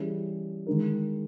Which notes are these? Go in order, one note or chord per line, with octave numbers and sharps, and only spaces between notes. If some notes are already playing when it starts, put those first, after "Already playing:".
Already playing: E3 G3 C#4 G#4
D#3 G#3 D#4 A#4